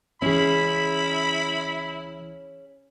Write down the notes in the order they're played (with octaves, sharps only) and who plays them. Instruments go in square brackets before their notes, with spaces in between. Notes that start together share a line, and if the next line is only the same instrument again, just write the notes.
[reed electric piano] C#2 E3 [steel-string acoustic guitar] C#4 G#4 [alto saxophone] E4 [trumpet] B5